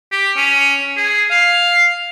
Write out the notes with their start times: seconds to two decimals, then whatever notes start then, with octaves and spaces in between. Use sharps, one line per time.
0.12 G4
0.37 C#4
0.97 G#4
1.31 F5